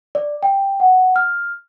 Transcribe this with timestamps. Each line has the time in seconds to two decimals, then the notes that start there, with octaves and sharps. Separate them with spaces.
0.15 D5
0.43 G5
0.80 F#5
1.16 F6